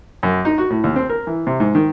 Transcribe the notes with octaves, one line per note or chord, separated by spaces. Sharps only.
F#2
D#4
F#4
A2
D#2
C4
A#4
E3
C3
G#2
D#3